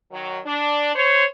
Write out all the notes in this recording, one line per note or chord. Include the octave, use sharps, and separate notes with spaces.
D#3 F#3
D4
C5 C#5